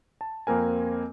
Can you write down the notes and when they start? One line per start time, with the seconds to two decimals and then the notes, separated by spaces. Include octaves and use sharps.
0.21 A5
0.47 F2 A#3 C4 A#4 G#5